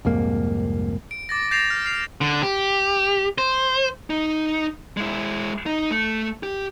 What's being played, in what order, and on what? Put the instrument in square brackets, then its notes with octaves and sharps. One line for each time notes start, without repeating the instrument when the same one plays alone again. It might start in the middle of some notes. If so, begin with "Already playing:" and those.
[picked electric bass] C2 F2 G#2 A#3
[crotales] D7
D6 A6 A#6
G6 A6 A#6 C7 E7 F7
F6
F6 C7 F7
[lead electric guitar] D3
G4
C5
D#4
G#3 E4
D#4
A3
G4